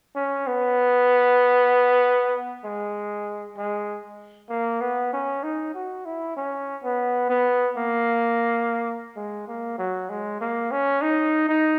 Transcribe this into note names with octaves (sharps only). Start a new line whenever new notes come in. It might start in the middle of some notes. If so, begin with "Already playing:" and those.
C#4
B3
G#3
G#3
A#3
B3
C#4
D#4
F#4
E4
C#4
B3
B3
A#3
G#3
A#3
F#3
G#3
A#3
C#4
D#4
D#4